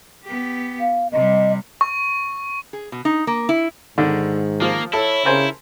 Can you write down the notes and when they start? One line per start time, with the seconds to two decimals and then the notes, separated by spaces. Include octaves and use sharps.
0.25 B3 G4
0.80 F5
1.12 C3 G3 D#5
1.81 C#6
2.73 G#4
2.92 B2
3.05 D#4
3.27 A#3
3.49 E4
3.98 G#2 D3 D#3
4.61 F3 A#3
4.93 E4 A4 C#5
5.25 C#3 A#4 C5 G#5